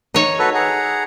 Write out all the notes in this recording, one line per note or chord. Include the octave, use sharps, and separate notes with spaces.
D#4 C#5
F#4 A4 B4
G#4 F#5 A#5